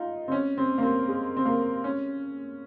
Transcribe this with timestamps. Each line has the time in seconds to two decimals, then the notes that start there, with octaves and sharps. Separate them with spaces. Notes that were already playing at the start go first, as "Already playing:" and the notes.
Already playing: D#4 F4
0.28 C4
0.32 C#4
0.58 C4
0.78 A#3
0.83 C4
1.08 G#3
1.37 C4
1.45 A#3
1.84 C#4